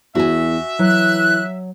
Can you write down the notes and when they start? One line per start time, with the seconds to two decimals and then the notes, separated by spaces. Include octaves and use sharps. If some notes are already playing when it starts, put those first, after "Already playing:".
0.15 E2 F#4 E5 G#5
0.79 E3 F#3 F#6